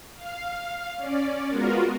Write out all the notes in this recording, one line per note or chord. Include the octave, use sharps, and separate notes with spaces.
F5
C#4 D5
G#3 B3 F4 F#4 A#4